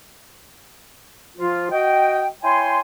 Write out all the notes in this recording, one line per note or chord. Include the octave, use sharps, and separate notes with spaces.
F3 F4
F#4 D#5 G5
E4 C#5 G5 G#5 C6